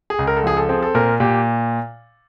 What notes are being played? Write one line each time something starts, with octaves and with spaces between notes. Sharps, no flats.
G#4
C#2
A#4
A4
F3 G#4
A4
C4 G#4
A4
A#2 A#4
A#2 G4